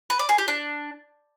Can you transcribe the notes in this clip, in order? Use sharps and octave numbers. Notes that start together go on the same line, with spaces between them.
B4
D5
G#4
G4
D4